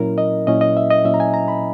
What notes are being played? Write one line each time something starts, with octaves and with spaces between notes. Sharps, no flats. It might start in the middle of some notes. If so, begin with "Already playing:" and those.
Already playing: A#2 F#3 C#4 E4 A#4
D#5
A#2 F#3 C#4 E4 D#5
D#5
E5
D#5
A#2 F#3 C#4 E4 E5
A#5
G#5
A#5
B5